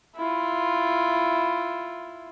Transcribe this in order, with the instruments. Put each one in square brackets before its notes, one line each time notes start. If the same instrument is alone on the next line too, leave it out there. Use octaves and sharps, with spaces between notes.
[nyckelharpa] E4 F4